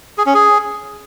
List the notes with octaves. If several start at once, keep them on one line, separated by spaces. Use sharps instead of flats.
G#4
C#4
G#4